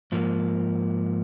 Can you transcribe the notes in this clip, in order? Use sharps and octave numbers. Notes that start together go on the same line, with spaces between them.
G#2 F3 A#3